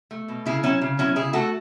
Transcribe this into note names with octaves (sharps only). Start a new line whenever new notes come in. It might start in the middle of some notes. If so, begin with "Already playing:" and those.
A3
B2
C#3 E4 G#4
F#3 C#4 E4
C#3
F#3 C#4 E4
C#3 E4 G#4
A3 F#4 A4